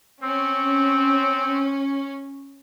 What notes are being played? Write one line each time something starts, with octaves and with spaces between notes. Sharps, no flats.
C4 C#4